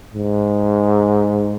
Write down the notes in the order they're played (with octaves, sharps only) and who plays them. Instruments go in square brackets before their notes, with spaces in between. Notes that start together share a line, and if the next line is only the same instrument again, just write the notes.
[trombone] G#2